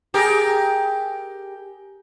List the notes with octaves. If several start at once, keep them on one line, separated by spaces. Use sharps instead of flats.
G4 G#4 A#4